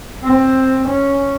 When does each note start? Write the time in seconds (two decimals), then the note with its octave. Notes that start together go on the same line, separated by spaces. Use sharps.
0.23 C4
0.87 C#4